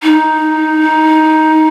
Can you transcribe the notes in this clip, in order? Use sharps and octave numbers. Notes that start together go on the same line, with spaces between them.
D#4